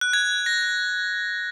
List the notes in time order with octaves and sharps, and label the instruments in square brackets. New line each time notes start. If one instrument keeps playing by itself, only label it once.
[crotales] F#6
G#6
A#6